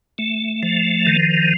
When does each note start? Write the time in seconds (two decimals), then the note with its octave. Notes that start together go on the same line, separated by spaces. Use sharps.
0.18 A3
0.63 F3
1.07 D#3